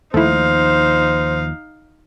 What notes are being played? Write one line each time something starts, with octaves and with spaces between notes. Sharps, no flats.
D#2 F3 A3 D#4 E4 C5 F5